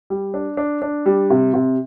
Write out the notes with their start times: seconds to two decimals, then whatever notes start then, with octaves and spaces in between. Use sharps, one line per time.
0.10 G3
0.34 D4
0.57 D4
0.82 D4
1.06 G3
1.30 C3
1.54 C3